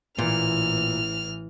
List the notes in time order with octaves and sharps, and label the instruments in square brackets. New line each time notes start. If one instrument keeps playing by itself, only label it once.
[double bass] A1 E3 [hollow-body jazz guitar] A#2 [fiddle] F6